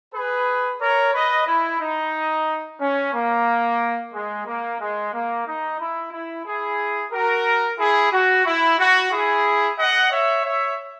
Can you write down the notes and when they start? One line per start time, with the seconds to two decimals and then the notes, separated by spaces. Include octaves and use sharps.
0.14 G#4 B4
0.81 A#4 C#5
1.14 B4 D#5
1.47 E4
1.81 D#4
2.81 C#4
3.14 A#3
4.14 G#3
4.47 A#3
4.81 G#3
5.13 A#3
5.47 D#4
5.80 E4
6.13 E4
6.46 E4 G#4
7.13 F#4 A#4
7.79 E4 G#4
8.13 F#4
8.46 E4
8.79 F#4
9.12 E4 G#4
9.79 D#5 F#5
10.12 C#5 E5
10.45 C#5 E5